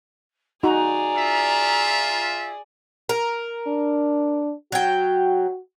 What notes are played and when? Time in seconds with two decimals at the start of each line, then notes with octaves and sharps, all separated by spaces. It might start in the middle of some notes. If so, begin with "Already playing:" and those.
0.63 D#4 F#4 G#4 D5 A#5
1.16 F4 E5
3.09 A#4
3.67 D4
4.72 F#3 F#4 G5